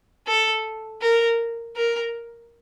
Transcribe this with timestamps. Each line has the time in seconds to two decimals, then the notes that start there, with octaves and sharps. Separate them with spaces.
0.27 A4
1.02 A#4
1.76 A#4